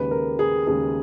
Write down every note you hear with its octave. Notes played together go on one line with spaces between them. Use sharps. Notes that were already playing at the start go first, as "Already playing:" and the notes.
Already playing: D#2 C#3 G#3 B4
A#4
G#4
D#2 C#3 G#3 G#4